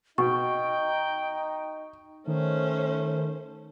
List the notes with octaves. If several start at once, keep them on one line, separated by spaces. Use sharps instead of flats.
B2 D#4 G5 C#6
D#3 A3 C#4 C5